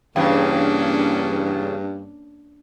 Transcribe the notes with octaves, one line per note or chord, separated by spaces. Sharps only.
E2 G2 C#3 A#3 C#4 D4